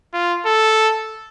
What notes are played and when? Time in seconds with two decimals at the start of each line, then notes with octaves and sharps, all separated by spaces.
0.13 F4
0.46 A4